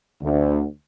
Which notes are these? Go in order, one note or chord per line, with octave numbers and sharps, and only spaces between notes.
D2